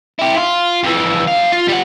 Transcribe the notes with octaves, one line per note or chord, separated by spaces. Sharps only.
E4 G4
F4
F2 E3
F#3 F5
F4
G3 F#5